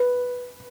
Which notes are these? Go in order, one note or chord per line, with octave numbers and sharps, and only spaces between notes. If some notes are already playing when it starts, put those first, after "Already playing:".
Already playing: B4